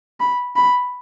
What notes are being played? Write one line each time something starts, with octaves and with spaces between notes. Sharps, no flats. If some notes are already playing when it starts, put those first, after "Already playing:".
B5
B5